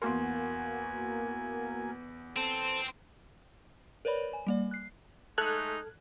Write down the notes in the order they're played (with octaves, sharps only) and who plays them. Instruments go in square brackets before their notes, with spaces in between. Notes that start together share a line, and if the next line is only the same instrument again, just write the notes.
[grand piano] E2 C6 [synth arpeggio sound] A#3 F#4 A#4 [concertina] G#5
[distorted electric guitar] C4 [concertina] A4 C5
[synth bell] A#4 B4 C#5 D5 B5
G#5
G3 A#3 D5
F#6 C7
[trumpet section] G#3 A3 D#4 [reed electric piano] A4 F6 G#6 [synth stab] F#6